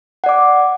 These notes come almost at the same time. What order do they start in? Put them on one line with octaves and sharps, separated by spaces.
F#5 D5 D6